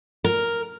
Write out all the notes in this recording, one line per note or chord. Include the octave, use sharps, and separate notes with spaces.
A#4